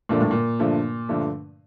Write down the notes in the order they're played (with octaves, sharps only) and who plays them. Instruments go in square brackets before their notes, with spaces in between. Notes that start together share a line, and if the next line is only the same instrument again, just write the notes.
[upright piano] G2 D3 F3 A3 D4 [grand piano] A#2
[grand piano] A2
A#2
[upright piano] G2 D3 F3 A3 D4
G2 D3 F3 A3 D4